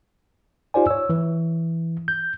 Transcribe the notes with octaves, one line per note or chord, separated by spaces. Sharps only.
D#4 F4 G4 C5 D5 G#5
C#5 E6
E3
G6